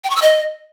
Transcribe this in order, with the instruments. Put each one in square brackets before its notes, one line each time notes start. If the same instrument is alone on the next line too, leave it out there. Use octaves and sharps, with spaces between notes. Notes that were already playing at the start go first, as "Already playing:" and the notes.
[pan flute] G5
C#6
E6
D#5